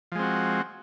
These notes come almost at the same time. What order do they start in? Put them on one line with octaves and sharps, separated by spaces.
F3 G#3 C4 F#4